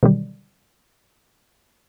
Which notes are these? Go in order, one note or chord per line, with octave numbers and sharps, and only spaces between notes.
B2 D3 D#3 F#3 G3